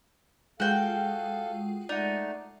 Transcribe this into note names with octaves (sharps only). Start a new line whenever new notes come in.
G#3 F4 F#4 A4 F5 G5
A3 D#4 D5 F#5